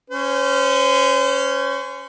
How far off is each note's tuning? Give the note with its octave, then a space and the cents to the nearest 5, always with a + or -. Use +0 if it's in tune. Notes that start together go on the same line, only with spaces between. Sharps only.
C#4 +0 C5 -35